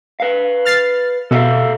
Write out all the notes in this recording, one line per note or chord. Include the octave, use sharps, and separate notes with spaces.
B4 F5
F6 A6 C7
B2 A4 E5 F5